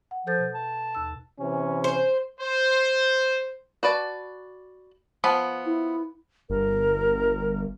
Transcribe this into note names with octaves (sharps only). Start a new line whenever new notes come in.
F#5
F3 A4 G6 A6
B2
A5
D#2 E6
C3 E3 C#4
C5
C5
F#4 B4 D5 A5
F3 B3 B5
E4
G1 A#4